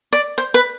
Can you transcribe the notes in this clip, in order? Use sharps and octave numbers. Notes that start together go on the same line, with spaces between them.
D5
C5
B4